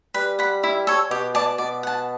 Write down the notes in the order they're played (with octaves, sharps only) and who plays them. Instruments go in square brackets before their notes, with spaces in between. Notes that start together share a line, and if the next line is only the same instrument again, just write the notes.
[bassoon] G3 [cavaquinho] B4
[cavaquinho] F#5 B5
E4
A4 C#5
[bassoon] B2 [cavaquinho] G4
[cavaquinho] D5 A5
[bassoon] B2 [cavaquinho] D5
[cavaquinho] F#5 A5